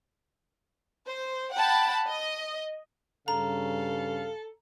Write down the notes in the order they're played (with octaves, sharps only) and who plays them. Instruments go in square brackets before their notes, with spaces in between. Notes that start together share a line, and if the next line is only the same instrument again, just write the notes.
[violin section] C5
F#5 G5 A5 B5
D#5
[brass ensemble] G2 C#3 [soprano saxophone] A4 [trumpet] F5 [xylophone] A#5